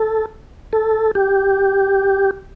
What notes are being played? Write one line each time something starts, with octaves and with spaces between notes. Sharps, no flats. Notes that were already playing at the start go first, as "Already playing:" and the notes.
Already playing: A4
A4
G4